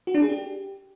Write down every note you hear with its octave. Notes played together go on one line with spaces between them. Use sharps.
F#4
D4
G#4
G4